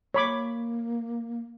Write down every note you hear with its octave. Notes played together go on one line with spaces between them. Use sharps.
A#3 C#5 B5 D6